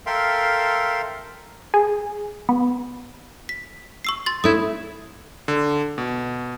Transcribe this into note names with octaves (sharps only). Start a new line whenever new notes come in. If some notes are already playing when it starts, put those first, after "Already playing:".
A4 A#4 E5 F5 G5 C6
G#4
B3
B6
C#6 E6 C7
C6 A6
A3 E4 D#6 G#6
D3
B2